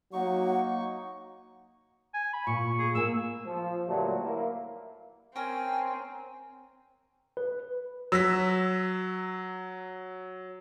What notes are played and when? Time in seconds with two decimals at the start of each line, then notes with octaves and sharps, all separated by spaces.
0.13 F#3 A#3 D#4 F#5 C#6
2.14 G#5
2.33 B5
2.47 A#2 C#6
2.79 G#4
2.95 A#3 G#5 E6
3.46 F3
3.88 A#2 D3 F#3 G3 A3 B3
4.23 A#3 E4
5.36 C4 C#4 A#4 G5 G#5
7.37 B4
8.12 F#3 E6 A#6 B6